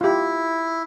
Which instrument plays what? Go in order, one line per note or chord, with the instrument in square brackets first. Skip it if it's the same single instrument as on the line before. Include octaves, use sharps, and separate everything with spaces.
[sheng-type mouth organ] E4 [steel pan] F4 G4